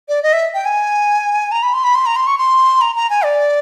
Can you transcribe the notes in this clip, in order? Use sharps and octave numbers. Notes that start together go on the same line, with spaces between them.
D5
D#5
E5
G5
G#5
A#5
B5
C6
B5
C6
A#5
C6
C#6
C6
A#5
A#5
G#5
D5